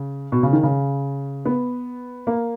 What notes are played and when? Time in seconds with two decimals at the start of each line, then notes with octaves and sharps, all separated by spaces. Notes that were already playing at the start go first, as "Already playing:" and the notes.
Already playing: C#3
0.32 B2
0.43 C#3
0.53 D#3
0.63 C#3
1.45 B3
2.27 A#3